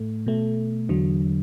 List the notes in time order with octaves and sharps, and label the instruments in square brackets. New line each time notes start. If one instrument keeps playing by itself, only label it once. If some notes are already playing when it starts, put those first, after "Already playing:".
Already playing: [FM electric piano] A2 A3
B2 A3
E2 D3 F#3